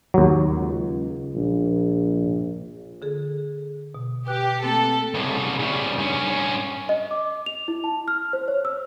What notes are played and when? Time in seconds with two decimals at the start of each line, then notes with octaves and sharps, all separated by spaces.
0.14 D#2 F#3
0.57 C#2
1.35 A#1
3.02 D3 G#4 A4
3.95 B2
4.27 G4 B4 F#6
4.63 A3 A#3 C4 A4
5.15 C2 C#3
5.60 C#3 G3
5.98 G2 C#4
6.89 D#5
7.11 D6
7.46 F7
7.68 E4
7.84 A5
8.08 F6
8.33 C5
8.48 C#5
8.65 E6